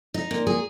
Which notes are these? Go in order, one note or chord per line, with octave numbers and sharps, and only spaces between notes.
D#4
A#2
G#4